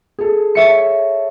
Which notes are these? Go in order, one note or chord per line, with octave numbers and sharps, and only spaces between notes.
G#4 A4
C#5 E5 C#7